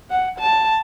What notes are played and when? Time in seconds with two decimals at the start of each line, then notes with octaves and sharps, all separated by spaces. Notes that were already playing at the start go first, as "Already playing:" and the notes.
0.10 F#5
0.39 A5